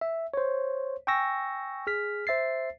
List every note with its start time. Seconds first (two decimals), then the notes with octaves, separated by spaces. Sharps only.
0.01 E5
0.34 C5 C#5
1.07 G5 G#5 C#6 E6 A#6
1.87 G#4 F6 B6
2.27 C5 E5 A6 C7